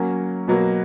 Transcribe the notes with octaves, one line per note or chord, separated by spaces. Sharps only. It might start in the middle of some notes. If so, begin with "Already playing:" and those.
Already playing: F#3 A#3 C#4
B2 F#3 A#3